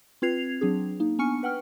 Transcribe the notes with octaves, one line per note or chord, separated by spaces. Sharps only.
C4 F4 B4 G#6 C7 F7
F#3 C4 D4 G#4
A#3 D#4
B3 D4 G#5 C#6 F6 C#7
B4 F#5 G5 F6